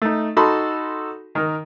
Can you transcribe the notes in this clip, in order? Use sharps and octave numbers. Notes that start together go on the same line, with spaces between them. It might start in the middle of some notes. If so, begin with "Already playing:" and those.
A3 D#4
D#4 F#4 A4 A5 B5 C6
D#3 A#4